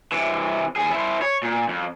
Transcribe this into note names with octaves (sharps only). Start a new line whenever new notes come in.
C3 E3
D#2 G#4
E4 C5
C#5
A#2
F2